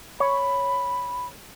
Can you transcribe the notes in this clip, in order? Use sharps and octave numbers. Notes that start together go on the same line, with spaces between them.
C#5 B5